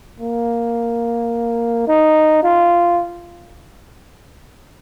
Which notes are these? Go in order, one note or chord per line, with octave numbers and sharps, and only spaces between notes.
A#3
D#4
F4